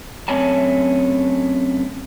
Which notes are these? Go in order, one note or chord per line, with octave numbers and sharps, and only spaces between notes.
F#2 A3 C4 C#5 G#5 A5